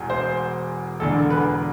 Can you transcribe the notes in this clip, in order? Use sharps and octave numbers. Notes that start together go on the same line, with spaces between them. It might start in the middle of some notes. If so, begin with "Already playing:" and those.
Already playing: E1 E2
C5
E1 E2 D3 A4
B4